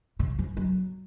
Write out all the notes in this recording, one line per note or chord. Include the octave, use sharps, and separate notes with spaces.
C#3
F3
F#3